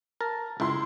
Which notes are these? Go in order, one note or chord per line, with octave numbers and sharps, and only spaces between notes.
A#4 A5
C#2 E4 C6